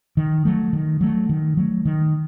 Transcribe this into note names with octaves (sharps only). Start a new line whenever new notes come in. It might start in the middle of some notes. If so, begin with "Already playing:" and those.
D#3
F#3 A3
D#3
F#3 A3
D#3
F#3 A3
D#3